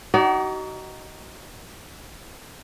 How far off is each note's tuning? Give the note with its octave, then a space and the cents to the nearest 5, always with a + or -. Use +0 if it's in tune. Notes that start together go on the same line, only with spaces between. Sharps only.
D#4 +0 F#4 +35 D5 -35